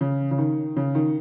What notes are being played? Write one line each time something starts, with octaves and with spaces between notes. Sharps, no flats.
C#3
C#3
D#3
C#3
D#3